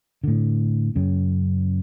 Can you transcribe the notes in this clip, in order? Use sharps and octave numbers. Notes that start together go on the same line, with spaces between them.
A2 D3
F#2 C#3